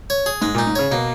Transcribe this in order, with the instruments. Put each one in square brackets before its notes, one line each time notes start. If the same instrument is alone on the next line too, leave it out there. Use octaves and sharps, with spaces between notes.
[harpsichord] C#5
G#4
[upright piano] G#2 [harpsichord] G#3
[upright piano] A#2
[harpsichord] D#4
[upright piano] G#2
[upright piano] C#3 [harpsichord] C#5
[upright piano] B2 [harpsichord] A#3